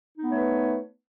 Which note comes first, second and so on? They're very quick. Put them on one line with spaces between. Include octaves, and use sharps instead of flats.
D#4 B3 A3 C#5 B4